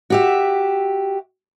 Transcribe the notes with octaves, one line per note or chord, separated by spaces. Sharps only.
F#4 G4 E5